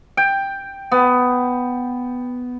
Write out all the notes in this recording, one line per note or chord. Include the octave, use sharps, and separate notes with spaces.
G5
B3